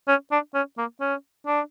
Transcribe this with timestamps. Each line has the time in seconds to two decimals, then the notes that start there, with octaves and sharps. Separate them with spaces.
0.08 C#4
0.32 D4
0.54 C#4
0.78 A#3
1.00 C#4
1.47 D4